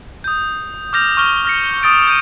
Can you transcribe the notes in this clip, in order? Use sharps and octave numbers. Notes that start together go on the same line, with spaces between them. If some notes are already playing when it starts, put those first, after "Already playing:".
D#6 G6
D6 F6 G6 A#6 F7
C#6 F6 G7
F6 A#6 C#7
D6 D#6 A6 D7
G6 D#7